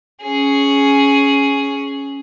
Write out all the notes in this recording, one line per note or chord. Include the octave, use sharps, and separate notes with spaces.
C#4 G#4